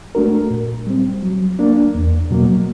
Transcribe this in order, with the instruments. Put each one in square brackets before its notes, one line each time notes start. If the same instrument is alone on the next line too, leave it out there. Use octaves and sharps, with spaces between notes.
[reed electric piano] A3 D4 F#4 A#4
A#2
G3 C4
F#3
A#3 D4
E2
B2 F#3 A#3